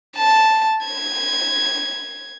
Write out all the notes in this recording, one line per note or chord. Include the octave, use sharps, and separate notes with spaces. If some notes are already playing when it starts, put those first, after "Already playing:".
A5
G#6